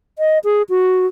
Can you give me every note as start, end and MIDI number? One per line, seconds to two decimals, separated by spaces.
0.19 0.39 75
0.44 0.62 68
0.70 1.06 66